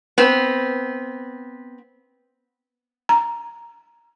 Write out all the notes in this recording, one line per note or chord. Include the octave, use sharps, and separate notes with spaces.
B3 C4
A#5